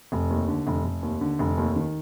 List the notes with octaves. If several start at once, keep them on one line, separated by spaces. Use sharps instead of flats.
F1
D#2
D3
F1
F1
D#2
D3
F1
D#2
D#3